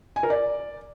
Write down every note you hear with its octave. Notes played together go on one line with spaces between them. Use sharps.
G#5
A#4
D5